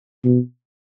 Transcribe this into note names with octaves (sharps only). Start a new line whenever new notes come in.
B2